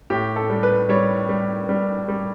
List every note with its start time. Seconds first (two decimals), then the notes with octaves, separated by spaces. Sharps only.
0.10 A2 G4
0.36 A4
0.50 G3
0.63 B4
0.89 G3 C#5
1.29 G3
1.69 G3
2.08 G3